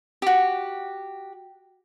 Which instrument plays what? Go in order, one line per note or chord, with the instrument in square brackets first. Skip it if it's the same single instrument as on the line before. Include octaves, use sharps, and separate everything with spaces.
[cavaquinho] F#4 G4